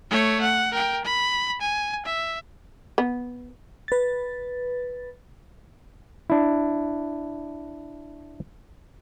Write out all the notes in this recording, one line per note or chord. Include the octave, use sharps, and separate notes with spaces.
A3 C#5
F#5
A#4 G5
B5
G#5
E5
B3
B4 A6
D4 E4